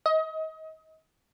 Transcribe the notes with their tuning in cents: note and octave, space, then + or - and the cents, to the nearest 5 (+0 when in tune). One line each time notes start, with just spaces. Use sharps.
D#5 +30